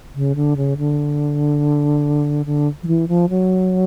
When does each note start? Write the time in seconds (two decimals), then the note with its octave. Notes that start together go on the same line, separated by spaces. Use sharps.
0.15 C#3
0.36 D3
0.57 C#3
0.78 D3
2.46 D3
2.83 F3
2.87 E3
3.08 F3
3.29 F#3